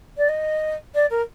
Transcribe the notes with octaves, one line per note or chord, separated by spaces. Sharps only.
D5
D#5
D5
A#4